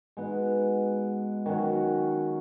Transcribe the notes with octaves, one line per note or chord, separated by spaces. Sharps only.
G#3 B3 D#4 F#4
D#3 F#3 C#4 F#4